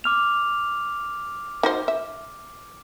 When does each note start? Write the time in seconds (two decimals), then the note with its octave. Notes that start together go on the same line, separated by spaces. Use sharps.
0.04 D6 F6 F7
1.63 D#4 F#4 C5
1.88 E5